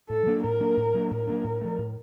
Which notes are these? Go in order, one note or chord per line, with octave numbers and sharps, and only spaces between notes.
A2 A4
F#3 A#3 D4
A2 A#4
F#3 A#3 D4
A2
F#3 A#3 D4
A2 A#4
F#3 A#3 D4
A2
F3 A3
A2